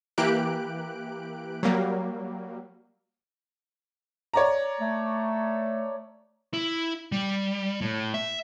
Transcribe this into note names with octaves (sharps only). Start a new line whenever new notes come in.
E3 A#3 G4 F#6 D7
F#3 G3 A#3
C#5 D5 A#5
A3
E4
G3
A2
E5